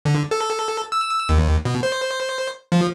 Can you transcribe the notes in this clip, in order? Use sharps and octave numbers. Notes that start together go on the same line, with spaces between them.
D3
A4
E6
D#2
B2
C5
F3